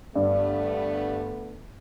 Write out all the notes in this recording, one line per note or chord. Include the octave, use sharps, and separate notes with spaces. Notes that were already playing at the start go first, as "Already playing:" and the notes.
G2 D3 A3 B3